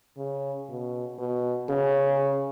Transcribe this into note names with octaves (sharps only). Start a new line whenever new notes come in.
C#3
B2
B2
C#3